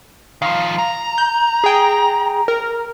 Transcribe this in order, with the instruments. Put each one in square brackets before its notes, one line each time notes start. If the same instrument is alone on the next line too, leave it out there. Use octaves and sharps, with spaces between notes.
[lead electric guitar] D#3 F3 [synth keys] F5
[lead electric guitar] A#5
[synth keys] G6
G#4 G5
A#4